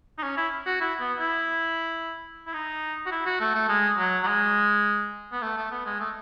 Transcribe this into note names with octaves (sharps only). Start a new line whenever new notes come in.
D#4
C#4
E4
F#4
E4
B3
E4
E4
D#4
F#4
E4
F#4
A3
A3
G#3
F#3
F#3
G#3
B3
A3
A3
B3
G#3
A3